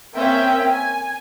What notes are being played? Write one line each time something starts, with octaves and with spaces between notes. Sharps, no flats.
A#3 C4 C#4 E5 G5
G#5